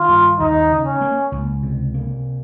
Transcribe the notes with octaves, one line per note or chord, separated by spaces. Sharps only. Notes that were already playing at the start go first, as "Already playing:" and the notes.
Already playing: D#3 F4
G2
D#2 D#4
C#3
C#4
A#3
C#2
C3
A#3